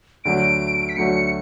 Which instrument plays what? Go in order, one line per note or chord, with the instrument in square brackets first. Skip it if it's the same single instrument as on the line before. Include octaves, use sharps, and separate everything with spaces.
[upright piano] D2 D3 F#3 A3 [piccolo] D7
[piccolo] B6
[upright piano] D2 D3 F#3 A3 [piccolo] C#7